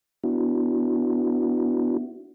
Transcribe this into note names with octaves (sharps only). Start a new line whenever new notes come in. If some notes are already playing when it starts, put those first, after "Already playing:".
B3 D4 E4 F#4